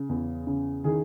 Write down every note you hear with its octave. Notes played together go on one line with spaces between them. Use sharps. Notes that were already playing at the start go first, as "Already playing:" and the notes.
Already playing: C#3
E2
C#3
D#3 G#4